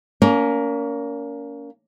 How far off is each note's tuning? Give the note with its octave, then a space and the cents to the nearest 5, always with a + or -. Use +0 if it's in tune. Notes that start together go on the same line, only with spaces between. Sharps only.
A#3 +0 C#4 +35